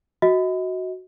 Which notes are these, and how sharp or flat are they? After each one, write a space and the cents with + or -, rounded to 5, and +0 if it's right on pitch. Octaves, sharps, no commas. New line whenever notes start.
F#4 +0 D#5 +30